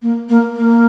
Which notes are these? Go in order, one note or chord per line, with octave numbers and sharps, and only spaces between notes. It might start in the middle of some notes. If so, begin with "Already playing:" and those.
A#3
A#3
A#3